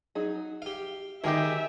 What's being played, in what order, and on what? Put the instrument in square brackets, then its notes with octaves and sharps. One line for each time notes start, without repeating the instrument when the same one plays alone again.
[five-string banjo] F#3 D#4 G#4
[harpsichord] G4 F5
[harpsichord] D#3 [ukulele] D#4 G4 G#4 [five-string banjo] A#4 [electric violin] E5